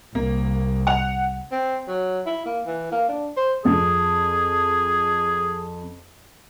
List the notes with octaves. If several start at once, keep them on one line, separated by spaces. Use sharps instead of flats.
C2 A#3
F#5 F7
C4
F#3
E4
A#3
E3
A#3
D4
C5
F2 G#4